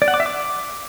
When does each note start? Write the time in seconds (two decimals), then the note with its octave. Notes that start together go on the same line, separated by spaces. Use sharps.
0.02 D5
0.08 F#5
0.14 D6
0.20 E5
0.26 D6